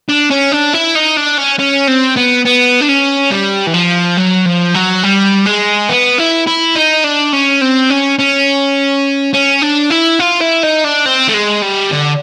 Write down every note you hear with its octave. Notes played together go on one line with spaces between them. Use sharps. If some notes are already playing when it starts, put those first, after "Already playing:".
D4
C#4
D4
E4
D#4
D4
C#4
C#4
C4
B3
B3
D4
C#4
G3
E3
F3
F#3
F3
F#3
G3
G#3
B3
E4
E4
D#4
D4
C#4
C4
C#4
C#4
C#4
D4
E4
F4
E4
D#4
D4
C4
A3
G#3
G3
D3